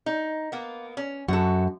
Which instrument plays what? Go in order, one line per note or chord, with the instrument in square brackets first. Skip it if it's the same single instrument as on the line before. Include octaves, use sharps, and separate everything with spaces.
[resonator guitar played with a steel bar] D#4
A#3 B3
C#4
[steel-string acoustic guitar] F#2 [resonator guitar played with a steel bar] F#4 A4